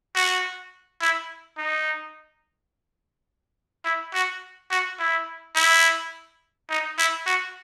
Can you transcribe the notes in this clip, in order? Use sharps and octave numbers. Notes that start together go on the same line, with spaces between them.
F#4
E4
D#4
E4
F#4
F#4
E4
E4
D#4
E4
F#4